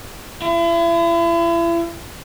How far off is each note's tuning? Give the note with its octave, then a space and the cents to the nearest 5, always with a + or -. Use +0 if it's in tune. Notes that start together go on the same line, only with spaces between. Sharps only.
E4 +40